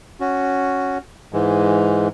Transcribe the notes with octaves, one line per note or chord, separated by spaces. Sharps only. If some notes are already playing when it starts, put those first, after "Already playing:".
C#4 F#4
G#2 E3 G#3